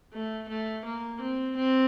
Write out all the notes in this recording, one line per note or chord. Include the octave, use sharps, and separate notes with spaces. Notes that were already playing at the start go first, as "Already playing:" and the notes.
A3
A3
A#3
C4
C4